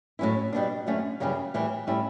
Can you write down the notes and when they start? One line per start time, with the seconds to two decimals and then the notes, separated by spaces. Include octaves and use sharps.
0.19 A2 F#3 C#4 E4
0.53 B2 G3 B3 D4
0.87 F#2 D3 A3 C#4
1.20 F#2 C#3 E3 G3 C#4
1.54 A2 E3 G3
1.87 A2 G3 C#4 E4